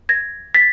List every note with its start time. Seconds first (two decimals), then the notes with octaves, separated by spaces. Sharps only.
0.09 G#6 A#6
0.54 A6 B6